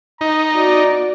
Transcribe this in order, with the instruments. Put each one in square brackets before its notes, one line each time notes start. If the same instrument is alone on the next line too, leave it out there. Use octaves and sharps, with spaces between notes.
[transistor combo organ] D#4 [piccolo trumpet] A#5
[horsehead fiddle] F#4 D5